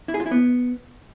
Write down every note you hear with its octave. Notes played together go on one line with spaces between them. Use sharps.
E4
G#4
F4
E4
B3